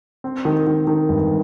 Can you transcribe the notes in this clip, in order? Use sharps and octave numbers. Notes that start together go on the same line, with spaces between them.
C4
D#3
D#3
D#3
G1